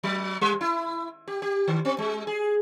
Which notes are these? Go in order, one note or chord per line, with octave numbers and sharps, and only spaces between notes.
F#3
G3
E4
G4
G4
D#3
C4
G#3
G#4